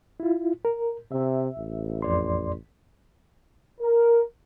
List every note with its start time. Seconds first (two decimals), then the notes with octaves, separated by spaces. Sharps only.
0.20 E4 F4
0.65 A#4
1.12 C3 E5
1.57 A1
2.02 F2 D5 C6
3.81 A#4